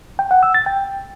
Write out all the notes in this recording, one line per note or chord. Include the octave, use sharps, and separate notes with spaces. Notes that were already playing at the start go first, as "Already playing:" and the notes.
G5
F#5
E6
A6
G5